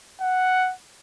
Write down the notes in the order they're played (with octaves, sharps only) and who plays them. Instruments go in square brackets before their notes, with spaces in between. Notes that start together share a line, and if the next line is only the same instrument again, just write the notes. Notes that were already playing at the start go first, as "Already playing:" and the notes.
[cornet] F#5